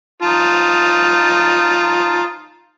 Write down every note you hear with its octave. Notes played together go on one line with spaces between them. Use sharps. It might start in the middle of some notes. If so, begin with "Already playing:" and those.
D#4 F4 A5